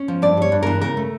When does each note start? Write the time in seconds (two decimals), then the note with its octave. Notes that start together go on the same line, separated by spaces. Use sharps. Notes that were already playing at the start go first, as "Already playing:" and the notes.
Already playing: C#4
0.08 F3
0.22 G2 D5
0.37 G3 C#5
0.52 G2
0.63 E3 A#4
0.81 C#3 A#4
0.97 A3